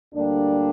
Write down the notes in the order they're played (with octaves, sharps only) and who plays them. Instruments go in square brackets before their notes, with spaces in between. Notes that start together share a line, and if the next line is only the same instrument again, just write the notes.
[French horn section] D2 D3 G3 A#3 D4